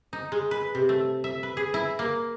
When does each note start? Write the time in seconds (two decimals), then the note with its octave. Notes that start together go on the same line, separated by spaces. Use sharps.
0.13 D#4
0.32 G#3
0.51 B4
0.75 C3
0.89 A3
1.24 E5
1.43 B4
1.57 G#4
1.74 E4
1.99 A#3